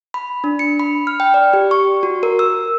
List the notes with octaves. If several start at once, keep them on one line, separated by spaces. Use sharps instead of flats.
B5
D4
C#7
B5
F6
G5
D5
G4
C#6
F#4
A#4
E6